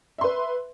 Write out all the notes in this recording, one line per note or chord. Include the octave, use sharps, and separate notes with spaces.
B4 E5 C6